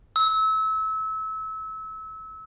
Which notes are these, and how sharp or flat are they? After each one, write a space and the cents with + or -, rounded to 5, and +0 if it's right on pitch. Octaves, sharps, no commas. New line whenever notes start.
E6 -30